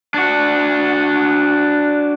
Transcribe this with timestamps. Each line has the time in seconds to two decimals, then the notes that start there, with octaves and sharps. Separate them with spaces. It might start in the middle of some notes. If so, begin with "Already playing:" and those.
0.14 D4 F#4